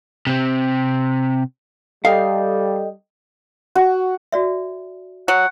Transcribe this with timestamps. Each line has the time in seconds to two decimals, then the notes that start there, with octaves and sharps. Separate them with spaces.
0.27 C3 C4
2.05 G3 A4 D#5 F5 G5
3.75 F#4
4.32 F#4 D5 E5
5.28 F#3 F#5